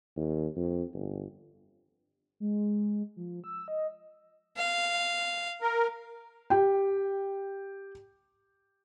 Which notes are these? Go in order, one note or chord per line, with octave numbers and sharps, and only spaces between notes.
D#2
F2
G1
G#3
F3
E6
D#5
F5
A#4
G4 G5